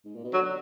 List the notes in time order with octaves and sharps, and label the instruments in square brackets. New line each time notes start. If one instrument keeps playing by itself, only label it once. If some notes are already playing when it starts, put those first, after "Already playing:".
[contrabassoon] G#2
A#2
B2
[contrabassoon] D3 [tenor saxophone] F#3